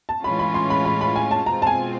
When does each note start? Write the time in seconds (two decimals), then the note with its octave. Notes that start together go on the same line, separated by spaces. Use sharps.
0.09 A5
0.24 A2 E3 G#3 C#4 F4 B5
0.39 B5
0.54 C6
0.70 B5
0.85 B5
1.01 B5
1.16 G#5
1.31 A5
1.46 B2 G#3 C4 F4 A#5
1.62 A5
1.67 G#5